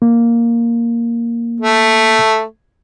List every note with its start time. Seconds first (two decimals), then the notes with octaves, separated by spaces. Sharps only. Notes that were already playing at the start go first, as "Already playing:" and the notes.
0.02 A#3
1.60 A3